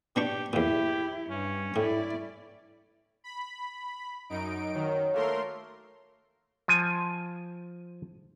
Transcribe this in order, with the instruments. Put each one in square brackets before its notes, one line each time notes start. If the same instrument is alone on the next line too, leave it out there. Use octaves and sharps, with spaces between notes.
[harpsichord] B2 D4 C#6 [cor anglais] G4
[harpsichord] E2 A#2 [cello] E4 [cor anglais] G4
[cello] G2 [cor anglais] C#4
[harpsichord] A2 [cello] E4 D5
[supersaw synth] B5
F#2 D#4 D7
[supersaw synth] D#3 [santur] F#3
[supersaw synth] A3 A#4 C6 [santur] A#3 A4 C#5
[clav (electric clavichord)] F3 G#5